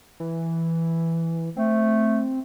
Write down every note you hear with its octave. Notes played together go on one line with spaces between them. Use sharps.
E3
A3 C4